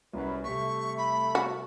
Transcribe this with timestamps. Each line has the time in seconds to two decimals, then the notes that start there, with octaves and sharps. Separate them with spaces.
0.13 C2 F#2 B4
0.44 C3 G3 A3 C#6 B6
0.98 B5
1.35 F#4